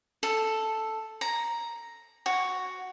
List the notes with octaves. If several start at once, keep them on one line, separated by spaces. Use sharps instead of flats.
A4
A#5
F#4